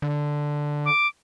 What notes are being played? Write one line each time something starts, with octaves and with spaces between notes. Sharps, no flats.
D3
D6